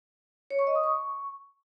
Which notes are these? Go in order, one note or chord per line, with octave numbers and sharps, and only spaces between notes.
C#5
C#6
D#5
D#6
C#6